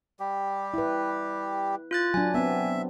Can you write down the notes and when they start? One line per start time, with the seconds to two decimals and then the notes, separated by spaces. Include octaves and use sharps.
0.20 G3 G4
0.74 E4 B4
1.91 F4 F#6 A6
2.14 F#3 D4 G#5
2.34 B3 C4 E5